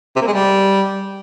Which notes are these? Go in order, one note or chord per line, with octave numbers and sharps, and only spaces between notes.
C3
A#3
G#3
G3